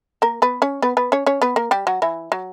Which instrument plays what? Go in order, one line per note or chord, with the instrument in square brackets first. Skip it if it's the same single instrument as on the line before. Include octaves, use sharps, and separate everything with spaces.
[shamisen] A#3 A#4
B3 B4
C#4 C#5
B3 B4
B3 B4
C#4 C#5
C#4 C#5
B3 B4
A#3 A#4
G3 G4
F#3 F#4
E3 E4
F#3